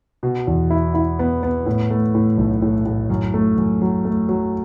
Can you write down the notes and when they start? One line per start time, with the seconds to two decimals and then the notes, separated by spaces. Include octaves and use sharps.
0.23 B2
0.47 E2
0.70 E4
0.95 E4
1.19 B3
1.43 B3
1.66 A2
1.91 A3
2.15 A2
2.37 B1
2.62 A2
2.85 A2
3.10 F#2
3.34 A3
3.58 F#2
3.82 F#3
4.05 A3
4.29 F#3